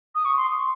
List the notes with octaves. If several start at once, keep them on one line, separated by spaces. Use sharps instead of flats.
D#6
C#6
C6